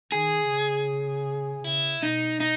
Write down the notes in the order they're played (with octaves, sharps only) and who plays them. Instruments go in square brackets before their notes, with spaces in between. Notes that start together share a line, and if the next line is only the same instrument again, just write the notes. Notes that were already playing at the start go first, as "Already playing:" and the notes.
[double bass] D#3 [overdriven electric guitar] G#4
[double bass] C#3
[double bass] C#3 [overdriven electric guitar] E4
[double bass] B2 [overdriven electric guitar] D#4
[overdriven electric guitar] D#4